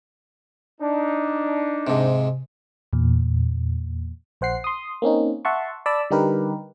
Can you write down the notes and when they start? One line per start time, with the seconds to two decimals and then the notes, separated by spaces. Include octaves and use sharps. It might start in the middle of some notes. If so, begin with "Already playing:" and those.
0.81 D4 D#4
1.87 G#2 C3
2.93 E2 A#2
4.41 A#1 C5 F#5 C7
4.64 C6 D#6
5.02 A#3 C4 C#4 D#4
5.45 E5 F#5 A5 C6 C#6
5.86 D5 A5 B5 E6
6.10 D3 G3 D#4 G4 A#4 B4